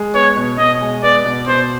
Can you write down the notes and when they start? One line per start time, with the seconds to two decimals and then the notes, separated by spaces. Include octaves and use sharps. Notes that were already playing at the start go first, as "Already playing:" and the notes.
Already playing: G#3
0.14 B3 C#5
0.36 B2
0.58 B2 D#5
0.81 G#3
1.03 B3 D5
1.25 B2
1.47 B2 C5